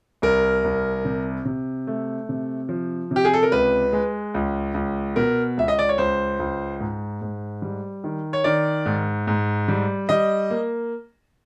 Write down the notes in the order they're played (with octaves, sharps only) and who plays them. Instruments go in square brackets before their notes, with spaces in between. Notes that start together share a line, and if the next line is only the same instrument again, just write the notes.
[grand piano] C2 A#4
C2
C3
C3
A3
C3
F3
C3
G4
G#4
A4
A#4
C#2 B4
G#3
C#2
C#2
B2 A#4
C#2 E5
D#5
D5
C#5
C#2 C5
C#2
G#2
G#2
G3
D#3
C#5
D#3 D5
G#2
G#2
G3
G3 D#5
A#3